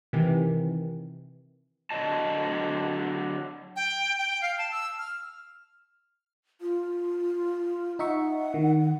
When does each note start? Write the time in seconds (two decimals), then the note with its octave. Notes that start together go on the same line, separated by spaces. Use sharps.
0.13 C3 D#3 E3
1.91 D3 F#3 D#5 A5
3.76 G5
4.18 G5
4.42 F5
4.58 A5
4.71 E6
4.99 F6
6.61 F4
7.99 D#4 E5 F#5 C#6
8.54 D#3